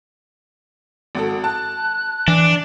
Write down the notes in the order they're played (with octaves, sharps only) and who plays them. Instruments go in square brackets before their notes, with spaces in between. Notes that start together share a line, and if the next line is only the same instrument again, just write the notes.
[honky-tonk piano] G#1 F#4 A4
[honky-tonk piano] A5 [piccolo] F#6
[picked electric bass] E3 [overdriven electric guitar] D4